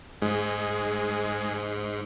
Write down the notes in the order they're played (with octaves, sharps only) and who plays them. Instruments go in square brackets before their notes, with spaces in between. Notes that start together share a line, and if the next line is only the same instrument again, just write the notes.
[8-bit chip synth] G#2 [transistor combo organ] G#3